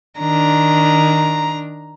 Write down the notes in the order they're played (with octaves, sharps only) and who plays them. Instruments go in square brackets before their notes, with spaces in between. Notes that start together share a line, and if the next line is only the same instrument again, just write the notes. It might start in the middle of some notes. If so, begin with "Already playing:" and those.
[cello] D#3 D4 [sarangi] A#5